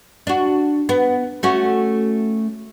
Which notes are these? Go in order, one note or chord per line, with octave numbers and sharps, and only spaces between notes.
D4 F#4
B3
A3 C#4 F#4